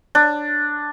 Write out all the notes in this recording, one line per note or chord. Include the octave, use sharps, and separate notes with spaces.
D4